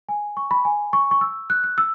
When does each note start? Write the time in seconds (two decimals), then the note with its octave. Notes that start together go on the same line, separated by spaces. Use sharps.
0.09 G#5
0.37 C#6
0.51 B5
0.65 G#5
0.93 C#6
1.11 C#6
1.21 E6
1.50 F#6
1.64 F#6
1.78 E6